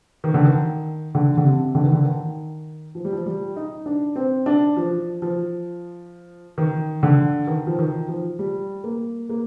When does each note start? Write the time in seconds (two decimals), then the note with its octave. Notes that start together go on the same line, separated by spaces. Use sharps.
0.24 D#3
0.34 D3
0.44 D#3
1.15 D3
1.37 D3
1.44 C3
1.75 D3
1.83 D#3
1.92 D3
2.05 D#3
2.95 F3
3.05 G3
3.12 F3
3.26 G3
3.56 D#4
3.86 D4
4.16 C4
4.46 D4
4.77 F3
5.22 F3
6.58 D#3
7.03 D3
7.47 D#3
7.67 F3
7.79 D#3
8.08 F3
8.39 G3
8.84 A#3
9.29 A#3